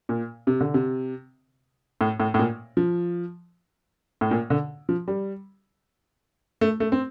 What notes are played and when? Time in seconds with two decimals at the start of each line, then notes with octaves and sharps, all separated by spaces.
0.09 A#2
0.47 C3
0.61 D3
0.74 C3
2.01 A2
2.20 A2
2.34 A2
2.39 A#2
2.77 F3
4.21 A2
4.31 A#2
4.50 D3
4.89 F3
5.08 G3
6.61 A3
6.80 A3
6.92 C4